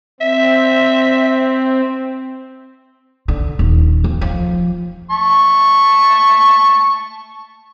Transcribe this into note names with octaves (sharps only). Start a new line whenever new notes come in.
C4 E5
D3
D#1
F2
F3
A5 C#6